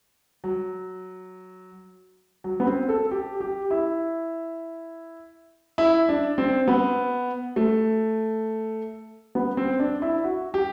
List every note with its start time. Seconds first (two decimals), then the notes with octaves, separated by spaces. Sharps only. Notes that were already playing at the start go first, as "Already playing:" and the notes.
0.44 F#3
2.44 F#3
2.60 B3
2.67 C4
2.89 A4
3.11 G4
3.40 G4
3.71 E4
5.78 E4
6.09 D4
6.38 C4
6.68 B3
7.56 A3
9.35 B3
9.57 C4
9.79 D4
10.02 E4
10.24 F#4
10.54 G4